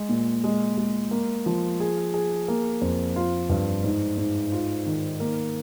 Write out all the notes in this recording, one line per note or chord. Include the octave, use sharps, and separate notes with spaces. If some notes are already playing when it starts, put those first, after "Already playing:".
Already playing: G#3
A#2
G#3
G#3
A#3
F3
G#4
G#4
A#3
F2
F4
G2
G#2
G#2
F4
D#3
A#3